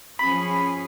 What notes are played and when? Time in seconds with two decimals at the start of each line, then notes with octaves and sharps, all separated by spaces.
0.19 F3 C#4 G#4 B5